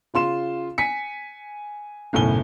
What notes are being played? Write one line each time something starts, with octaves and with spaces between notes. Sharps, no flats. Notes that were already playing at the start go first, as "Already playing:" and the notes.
C#3 F4 C6 E7
G#5 B6 C#7
F#1 B1 A2 G#5 G7